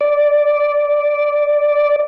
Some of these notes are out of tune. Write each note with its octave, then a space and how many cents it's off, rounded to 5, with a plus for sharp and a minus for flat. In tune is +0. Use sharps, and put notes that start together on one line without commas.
D5 -5